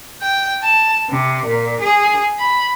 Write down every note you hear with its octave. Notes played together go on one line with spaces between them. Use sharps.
G5
A5
C3
A#2
G#4
B5